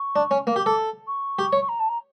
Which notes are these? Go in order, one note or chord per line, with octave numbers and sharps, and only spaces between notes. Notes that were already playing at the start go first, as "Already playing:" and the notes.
Already playing: C#6
D4
C#4
A#3 D6
G4
A4
C#6
G4
C#5
C#6
A#5
A5
A#5